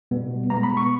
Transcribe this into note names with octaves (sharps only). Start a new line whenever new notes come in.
B2 G3 B3
B2 G#3 B3 A#5
B5
C#6